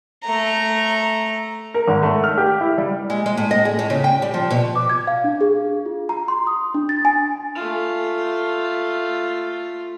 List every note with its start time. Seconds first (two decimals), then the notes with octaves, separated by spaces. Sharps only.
0.24 A3 A#5
1.74 A#4
1.88 G#1
2.02 A3
2.24 F6
2.38 G4
2.61 E4
2.78 G3
3.10 G#3
3.26 G#3
3.37 A2
3.51 D#5
3.65 G#4
3.79 A2
3.90 C#3
4.04 G5
4.22 G3
4.34 F3
4.51 B2
4.76 D6
4.90 G#6
5.07 F5
5.24 D4
5.41 G#4
5.86 F4
6.09 A#5
6.28 C6
6.47 D#6
6.74 D4
6.89 A6
7.05 G#5
7.55 A3 F4